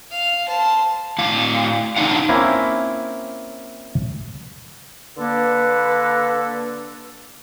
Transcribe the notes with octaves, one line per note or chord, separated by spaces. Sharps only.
F5
C5 A5
A2 F5
D3 D4 D#4 F5 F#5
A#3 C4 C#4 E4
D3 A#3 A4 B4